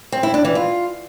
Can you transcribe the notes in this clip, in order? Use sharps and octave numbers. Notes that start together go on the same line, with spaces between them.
C4
E4
D4
E3
F4